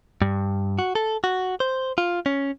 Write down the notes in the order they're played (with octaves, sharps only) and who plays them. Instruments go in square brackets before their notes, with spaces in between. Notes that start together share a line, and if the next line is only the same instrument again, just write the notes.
[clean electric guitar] G2
F#4
A4
F#4
C5
F4
C#4